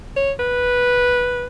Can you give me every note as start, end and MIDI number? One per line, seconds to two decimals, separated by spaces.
0.17 0.32 73
0.39 1.46 71